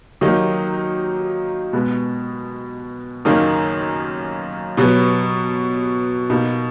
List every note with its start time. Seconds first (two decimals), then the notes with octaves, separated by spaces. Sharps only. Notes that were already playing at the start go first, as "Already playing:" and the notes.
0.21 D#3 F#3 A#3 D#4
1.73 B2 G#3 B3
3.25 F#2 D#3 A#3 D#4 G#4
4.77 B2 F#3 B3
6.30 B2 A#3 D#4